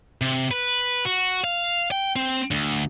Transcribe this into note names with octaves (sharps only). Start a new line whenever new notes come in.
C3
B4
F#4
F5
G5
C4
D2